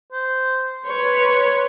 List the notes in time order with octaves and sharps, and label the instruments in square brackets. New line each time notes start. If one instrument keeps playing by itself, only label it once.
[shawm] C5
[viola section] B4 C#5 [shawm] C6